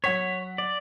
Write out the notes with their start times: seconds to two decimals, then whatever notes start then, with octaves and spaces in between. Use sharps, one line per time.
0.04 F#3 C#5 F#5 B6
0.58 D5